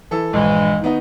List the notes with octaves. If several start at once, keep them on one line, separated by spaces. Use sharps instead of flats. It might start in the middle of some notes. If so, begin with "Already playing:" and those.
E3 A4
A#1 G2 E3 G#3
D#3 B3 D#4